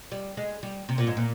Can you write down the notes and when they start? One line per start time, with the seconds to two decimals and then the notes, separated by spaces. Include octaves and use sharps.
0.12 G3
0.37 G#3
0.63 G3
0.89 C3
0.98 A#2
1.07 G#2
1.17 A#2